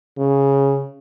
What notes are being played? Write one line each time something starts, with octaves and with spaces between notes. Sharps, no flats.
C#3